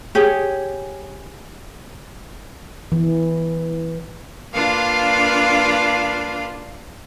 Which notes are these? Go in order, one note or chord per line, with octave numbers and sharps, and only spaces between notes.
G4 G#4 C#5
E3
A#3 D4 F4 B4 F5 D6